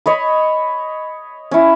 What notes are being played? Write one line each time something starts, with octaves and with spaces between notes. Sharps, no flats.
C#5 D#5 B5
C#4 E4